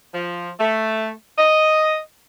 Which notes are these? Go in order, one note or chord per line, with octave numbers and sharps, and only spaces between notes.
F3
A3
D#5